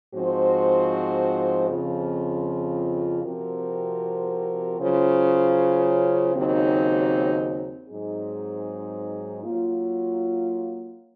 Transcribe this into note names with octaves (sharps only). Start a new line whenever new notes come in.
G#2 F3 C4 F#4 C5
F2 C#3 F3 C4 F4
C3 F3 C4 F#4 A#4
C#3 F#3 C#4 F4 C5
D#2 C#3 F#3 C4 D#4
G#2 F#3 C4 D#4 G#4
F#3 A#3 F4